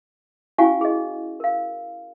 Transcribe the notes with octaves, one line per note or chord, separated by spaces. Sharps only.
C#4 E4 F#4 F5 G#5 C#6
G#4 D#5
A#4 F5